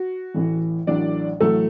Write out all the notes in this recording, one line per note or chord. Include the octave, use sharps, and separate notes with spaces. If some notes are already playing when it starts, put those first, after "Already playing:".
Already playing: F#4
A1 A2 E3
A1 A2 F#3 D4 D5
A1 A2 F#3 A3 A4